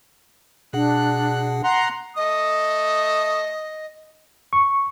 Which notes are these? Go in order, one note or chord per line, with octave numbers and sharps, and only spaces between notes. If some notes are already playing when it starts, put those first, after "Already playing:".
B2 D4 G#4 F#5 F#6
F#5 A#5 C6
A3 D#5 D#6
C#6